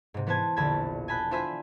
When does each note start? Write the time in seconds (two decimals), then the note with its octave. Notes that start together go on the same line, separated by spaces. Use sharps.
0.14 G#2 C3
0.27 E3 B3 B4 C5 A5 G#6
0.56 E1 A#1 D3 A5 B5 G#6
1.08 G#5 A5 B5 F#6 G6
1.31 D4 F4 C5 E5 G#5 B5